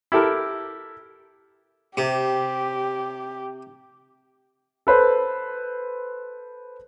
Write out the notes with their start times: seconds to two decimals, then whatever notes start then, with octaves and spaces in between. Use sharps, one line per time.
0.12 E4 G4 A4 A#4
1.97 C3 G4
4.87 A4 B4 C5